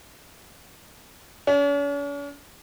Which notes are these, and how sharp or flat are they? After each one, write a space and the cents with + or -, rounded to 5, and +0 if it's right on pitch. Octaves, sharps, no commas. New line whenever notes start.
C#4 +45